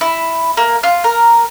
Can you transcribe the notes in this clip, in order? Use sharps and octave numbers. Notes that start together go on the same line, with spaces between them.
E4
A#3
F4
A#4